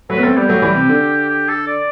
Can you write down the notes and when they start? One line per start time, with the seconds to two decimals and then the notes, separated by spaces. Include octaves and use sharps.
0.10 F#3 A3 B4
0.18 B3
0.23 A3 C4 A4
0.37 G3 B3 G4
0.49 F#3 A3
0.62 E3 G3
0.75 C3
0.89 D3
1.28 G4
1.48 A4
1.67 D5